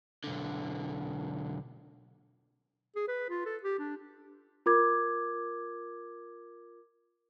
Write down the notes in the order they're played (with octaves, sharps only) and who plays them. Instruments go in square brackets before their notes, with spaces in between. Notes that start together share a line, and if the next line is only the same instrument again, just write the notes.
[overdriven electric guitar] B1 D3
[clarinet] G#4
B4
F4
A4
G4
D4
[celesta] F4 A#4 D6 G#6